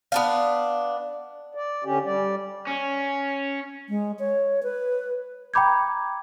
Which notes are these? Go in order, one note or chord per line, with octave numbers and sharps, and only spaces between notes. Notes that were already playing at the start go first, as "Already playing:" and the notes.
B3 D4 F5
D5
D3 C#4 G4
G3 D5
C#4
G#3
C#5
B4
G5 A#5 B5 D6 G6 G#6